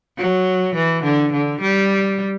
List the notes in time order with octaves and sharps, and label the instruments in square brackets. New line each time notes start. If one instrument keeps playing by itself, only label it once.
[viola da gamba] F#3
E3
D3
D3
G3